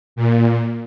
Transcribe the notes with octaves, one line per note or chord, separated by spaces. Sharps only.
A#2
A#2